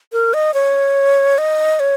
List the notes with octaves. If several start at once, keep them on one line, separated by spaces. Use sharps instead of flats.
A#4
D#5
C#5
D#5
C#5